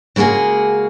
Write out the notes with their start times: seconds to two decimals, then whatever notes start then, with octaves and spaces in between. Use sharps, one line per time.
0.16 C#3 G#3 A#3 F#4 G#4